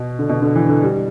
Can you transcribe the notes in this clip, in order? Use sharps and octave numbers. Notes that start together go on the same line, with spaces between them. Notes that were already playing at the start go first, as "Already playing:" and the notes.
Already playing: B2
D3
B2
D3
E3
D3
G3